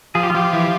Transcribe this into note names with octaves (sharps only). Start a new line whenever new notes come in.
F3 G#4
G4
F4
F3 G4
E3 G4